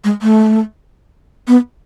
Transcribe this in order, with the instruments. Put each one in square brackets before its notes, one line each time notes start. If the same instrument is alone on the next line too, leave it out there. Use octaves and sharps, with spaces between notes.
[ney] G#3
A3
B3